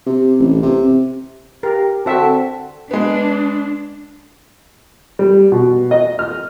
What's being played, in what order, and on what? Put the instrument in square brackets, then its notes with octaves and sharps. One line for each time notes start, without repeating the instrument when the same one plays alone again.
[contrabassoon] C3
A1
C3
[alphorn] G4 [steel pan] A#4
[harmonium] D3 A5 [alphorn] C4 [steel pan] F#4 E5
[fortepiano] G#3 B3 [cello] D4
[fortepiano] G3
B2
D#5
F6